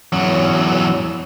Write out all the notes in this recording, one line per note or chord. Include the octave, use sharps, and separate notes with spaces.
E2 F#3